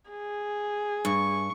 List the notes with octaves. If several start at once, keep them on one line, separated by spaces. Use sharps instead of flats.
G#4
G2 C#6